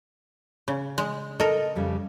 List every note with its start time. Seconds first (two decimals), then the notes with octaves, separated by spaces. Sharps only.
0.68 C#3
0.98 G#3
1.40 A4 A#4 D#5
1.75 F2 C#3 G3